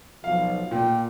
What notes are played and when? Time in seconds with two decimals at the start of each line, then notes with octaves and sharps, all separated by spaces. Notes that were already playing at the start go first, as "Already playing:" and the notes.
0.24 B1 F3 F5
0.71 A#2 A3 A#3 G5